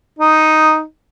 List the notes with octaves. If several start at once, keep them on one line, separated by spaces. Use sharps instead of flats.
D#4